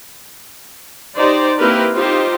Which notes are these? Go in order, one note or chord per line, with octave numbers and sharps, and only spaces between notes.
D#4 G4 C5 D5
A#3 C4 E4 G4 A#4 B4
D#4 F4 G4 C5